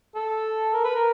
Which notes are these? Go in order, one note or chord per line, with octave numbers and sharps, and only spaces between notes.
A4
A#4
B4
A#4